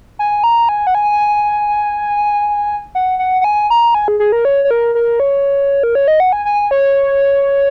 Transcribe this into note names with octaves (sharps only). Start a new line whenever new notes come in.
G#5
A#5
G#5
F#5
G#5
F#5
F#5
F#5
G#5
A#5
G#5
G#4
G#4
A#4
C#5
C#5
A#4
A#4
C#5
A#4
C#5
D#5
F#5
G#5
G#5
C#5